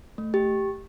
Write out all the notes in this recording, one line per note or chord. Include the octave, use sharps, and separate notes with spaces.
A3
G4